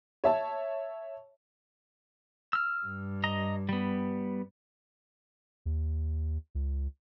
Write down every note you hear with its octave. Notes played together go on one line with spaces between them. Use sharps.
C#5 E5 A5
E6 F6
G2
D#5 A#5
G3 B3
D#2
C#2